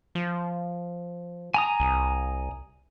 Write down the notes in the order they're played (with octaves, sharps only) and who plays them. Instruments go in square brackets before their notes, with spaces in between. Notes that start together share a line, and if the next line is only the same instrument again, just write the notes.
[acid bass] F3
[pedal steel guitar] G#5 A#5 D#6
[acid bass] C2